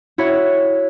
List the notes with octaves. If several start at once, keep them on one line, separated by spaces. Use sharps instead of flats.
E4 F#4 C#5 E5